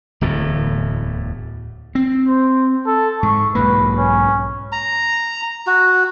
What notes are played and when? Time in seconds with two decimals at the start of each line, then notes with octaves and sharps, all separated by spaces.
0.21 D1 E2 A2
1.95 C4
2.27 C5
2.86 A4
3.23 G#2 C#6
3.55 B1 G#2 A#3 B4
3.98 C#4
4.72 A#5
5.67 F#4